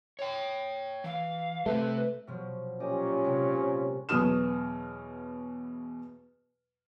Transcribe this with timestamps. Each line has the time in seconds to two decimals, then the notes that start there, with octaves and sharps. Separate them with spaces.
0.19 C#5 G5
1.04 E3 F5
1.66 C3 A3 C4 B4 C5
2.27 B2 F3 F#3
2.80 A#2 C#4 G4 D5 D#5
3.24 C3 G#3
4.09 E2 B2 F#3 D#6 F6 E7